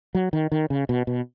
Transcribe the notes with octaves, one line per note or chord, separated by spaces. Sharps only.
F#3
D#3
D#3
C#3
B2
B2